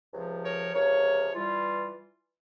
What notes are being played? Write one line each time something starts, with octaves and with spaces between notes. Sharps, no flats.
C#2 C3 F3
A#4 C#5
C#2 C3 F3 A#4 C#5
E3 G3 F4